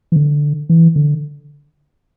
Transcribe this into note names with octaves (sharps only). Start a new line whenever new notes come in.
E3
D3
E3
D3